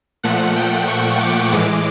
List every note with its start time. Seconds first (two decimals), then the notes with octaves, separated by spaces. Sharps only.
0.23 A#2 F3 A3 F#5
0.56 G5
0.88 C#6
1.20 D6
1.52 A2 E3 G#3 D6